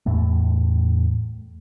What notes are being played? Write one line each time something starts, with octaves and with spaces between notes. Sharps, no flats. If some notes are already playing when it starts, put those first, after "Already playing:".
E2 A2 A3